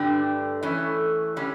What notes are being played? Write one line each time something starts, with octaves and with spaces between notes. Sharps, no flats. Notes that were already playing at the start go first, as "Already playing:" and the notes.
Already playing: G2 D3 A3 D4 G4
E3 A3 C#4
D3 G3 C#4